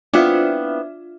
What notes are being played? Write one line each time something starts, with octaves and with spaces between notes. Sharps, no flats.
B3 C4 D4 E4 F4 E5